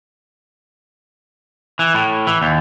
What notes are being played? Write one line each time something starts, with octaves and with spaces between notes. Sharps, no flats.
E3
A2
E3
D#2